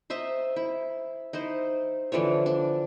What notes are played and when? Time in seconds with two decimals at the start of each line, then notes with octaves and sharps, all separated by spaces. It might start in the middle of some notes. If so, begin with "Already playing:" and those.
0.10 C5 D#5 E5 A#5
0.56 E4
1.33 D#4 E4 C5
2.12 D3 E3 F3 C#5
2.46 D4